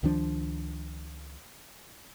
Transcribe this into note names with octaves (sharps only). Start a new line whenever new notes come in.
C#2 D#3 F3 D4